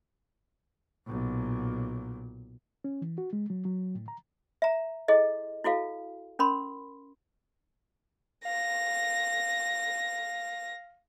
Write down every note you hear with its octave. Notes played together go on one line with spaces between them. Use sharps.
B1 A#2
C#4
E3
F#4
G#3
F#3
F#3
A2
A#5
E5 A#5
E4 G#4 A4 D#5
E4 F#4 A4 F5
C#4 A#4 B5 C6
F5 A#6